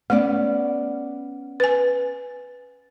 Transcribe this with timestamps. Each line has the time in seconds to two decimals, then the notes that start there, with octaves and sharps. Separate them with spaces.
0.10 A3 B3 C#4 D5
1.60 B4 G#5